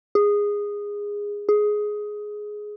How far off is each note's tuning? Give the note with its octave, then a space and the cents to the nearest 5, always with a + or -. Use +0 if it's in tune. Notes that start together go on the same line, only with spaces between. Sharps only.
G#4 -15
G#4 +10